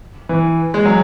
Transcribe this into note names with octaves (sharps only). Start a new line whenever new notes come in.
E3
G#3
F#3